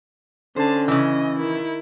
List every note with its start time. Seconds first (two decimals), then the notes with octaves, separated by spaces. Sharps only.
0.56 D3 C#4 C5 A5
0.88 C#3 E3 D#5
1.37 D#3 E4